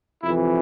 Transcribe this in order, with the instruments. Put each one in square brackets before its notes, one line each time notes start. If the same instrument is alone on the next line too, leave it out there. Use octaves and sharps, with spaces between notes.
[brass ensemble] F2 C3 E3 E4